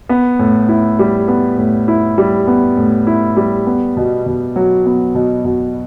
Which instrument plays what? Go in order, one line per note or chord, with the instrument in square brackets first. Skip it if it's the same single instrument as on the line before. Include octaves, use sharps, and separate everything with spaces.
[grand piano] B3
A2
E4
G3
B3
A2
E4
G3
B3
A2
E4
G3
B3
B2
B2
F#3
B3
B2
B2